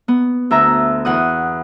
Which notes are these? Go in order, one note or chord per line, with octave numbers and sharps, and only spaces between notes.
B3
D2 E5 A#5
E2 F#5 D#6